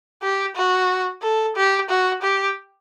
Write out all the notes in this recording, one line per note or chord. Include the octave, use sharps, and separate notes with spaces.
G4
F#4
A4
G4
F#4
G4